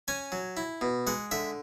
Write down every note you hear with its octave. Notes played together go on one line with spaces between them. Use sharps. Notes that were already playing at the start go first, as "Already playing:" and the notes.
C#4 G#5
F#3
E4
B2
G#3 F#5
D3 E5